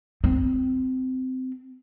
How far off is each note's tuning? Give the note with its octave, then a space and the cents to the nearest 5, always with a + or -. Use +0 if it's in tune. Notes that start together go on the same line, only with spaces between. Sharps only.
C4 -20